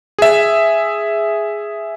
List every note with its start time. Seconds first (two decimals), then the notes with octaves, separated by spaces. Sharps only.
0.19 G#4 E5